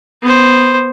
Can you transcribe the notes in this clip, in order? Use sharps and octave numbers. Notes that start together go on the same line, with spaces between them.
B3 C5